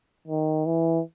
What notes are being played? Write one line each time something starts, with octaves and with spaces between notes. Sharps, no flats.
D#3
E3